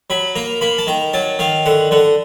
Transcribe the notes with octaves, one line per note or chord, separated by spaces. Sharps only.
F#3 B5
A#3 A#5
A#3 B5
A5
D#3 A#5
F#3 A5
D#3 F5
D3 F#5
D3 F#5